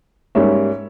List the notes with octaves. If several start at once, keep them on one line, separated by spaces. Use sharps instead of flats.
G#2 G3 A#3 C#4 C#5 E5